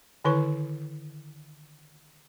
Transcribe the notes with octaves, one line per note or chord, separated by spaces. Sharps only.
D3 D#3 E4 B4 C#5 C#6